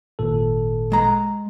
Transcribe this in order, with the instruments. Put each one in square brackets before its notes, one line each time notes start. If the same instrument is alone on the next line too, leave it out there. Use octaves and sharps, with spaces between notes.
[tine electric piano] G#1 A#2 A4
[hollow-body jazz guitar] G#3 A#5